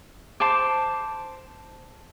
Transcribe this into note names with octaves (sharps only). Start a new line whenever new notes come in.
C5 A5 D6